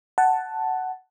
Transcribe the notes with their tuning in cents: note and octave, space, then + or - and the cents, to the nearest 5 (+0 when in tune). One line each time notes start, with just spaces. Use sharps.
F#5 +10 A5 +0